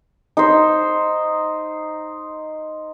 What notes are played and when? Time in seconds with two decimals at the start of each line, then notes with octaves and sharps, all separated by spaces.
0.37 D#4 C5